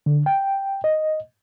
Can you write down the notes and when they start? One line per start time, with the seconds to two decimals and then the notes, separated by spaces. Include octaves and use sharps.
0.06 D3
0.26 G5
0.84 D#5